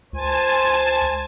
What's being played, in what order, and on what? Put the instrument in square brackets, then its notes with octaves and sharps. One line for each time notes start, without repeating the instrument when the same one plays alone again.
[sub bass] C#2 [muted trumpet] C5 [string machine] G#5 A5